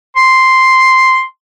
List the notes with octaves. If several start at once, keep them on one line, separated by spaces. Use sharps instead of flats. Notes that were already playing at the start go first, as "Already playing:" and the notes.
C6